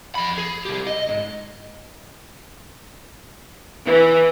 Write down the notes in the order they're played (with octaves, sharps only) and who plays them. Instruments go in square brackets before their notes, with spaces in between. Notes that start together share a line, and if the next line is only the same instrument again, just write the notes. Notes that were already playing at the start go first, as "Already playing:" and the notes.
[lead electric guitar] F2 B5
G#4
C2 G4
D#5
G#2
[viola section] E3